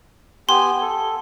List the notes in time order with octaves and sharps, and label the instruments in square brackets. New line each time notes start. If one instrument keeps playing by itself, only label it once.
[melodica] B3 G4 G#5 [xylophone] C6
[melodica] A4